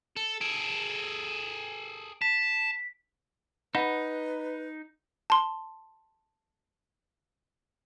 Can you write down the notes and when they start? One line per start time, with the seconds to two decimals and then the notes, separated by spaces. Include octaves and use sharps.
0.16 A4
0.41 G#4 A4 D7
2.22 A5 B6
3.75 D#4 B4 F#5 B5
5.30 A5 C6